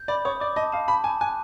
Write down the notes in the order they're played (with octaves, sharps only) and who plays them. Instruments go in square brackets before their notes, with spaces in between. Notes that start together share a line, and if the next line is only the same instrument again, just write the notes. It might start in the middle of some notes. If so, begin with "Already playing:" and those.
Already playing: [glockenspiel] G6
[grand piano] D5 [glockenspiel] B5
[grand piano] C#5 [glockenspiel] D#6
[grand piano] D5 [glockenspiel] D6
[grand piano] D#5 [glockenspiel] A5
[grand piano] F5 [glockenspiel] A5
[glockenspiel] A5 [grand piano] B5
[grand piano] G#5 [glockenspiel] A5
[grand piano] G#5 [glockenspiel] F#6